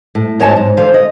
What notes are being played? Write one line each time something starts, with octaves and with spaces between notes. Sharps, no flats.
A2
G#2 F#3 C#5 D#5 G#5 A5
G#2
D3 E3 C5 F5
D#5